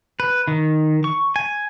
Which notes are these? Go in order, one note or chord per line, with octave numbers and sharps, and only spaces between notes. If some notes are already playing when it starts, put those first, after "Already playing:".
B4
D#3
C#6
G#5